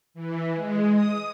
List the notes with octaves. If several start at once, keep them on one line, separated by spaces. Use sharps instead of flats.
E3
G#3
D#6